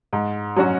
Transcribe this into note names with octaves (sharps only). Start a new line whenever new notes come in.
G#2
F#3 C#4 F#4